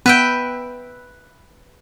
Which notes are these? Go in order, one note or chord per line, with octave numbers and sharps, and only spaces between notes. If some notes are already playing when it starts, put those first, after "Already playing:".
B3 B4 E5 G5